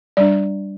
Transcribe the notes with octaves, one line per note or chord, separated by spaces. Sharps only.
G3 D4 D5